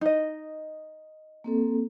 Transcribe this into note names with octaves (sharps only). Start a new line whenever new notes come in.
D#4 D#5
A#3 C4 A4